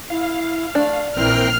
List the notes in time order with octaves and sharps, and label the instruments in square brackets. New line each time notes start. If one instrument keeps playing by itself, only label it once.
[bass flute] E4 [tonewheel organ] F5
[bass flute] A3 [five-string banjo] D4
[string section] A#1 F6 C7 [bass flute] E3 [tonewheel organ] C4 A#4 G5